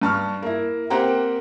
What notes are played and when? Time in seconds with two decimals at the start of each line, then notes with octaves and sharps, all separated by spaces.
0.02 G2 A5 C#6 F6
0.42 A#3 E4
0.90 A#3 C4 G4 F#5 G5 A#5